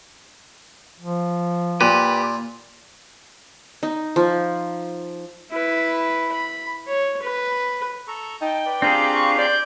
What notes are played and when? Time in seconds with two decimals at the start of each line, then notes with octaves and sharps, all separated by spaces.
0.98 F3
1.81 A#2 G4 B4
3.83 D#4
4.16 F3
5.51 E4 B4
6.32 B5
6.88 C#5
7.22 B4
8.08 A4 A#5 C#6
8.41 D#4 G5 A5
8.65 B4 D5
8.82 C4 D4 F4 G4 G#4 F5 A#5
9.14 C#6
9.39 D5 G6